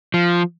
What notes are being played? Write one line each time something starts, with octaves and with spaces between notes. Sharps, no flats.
F3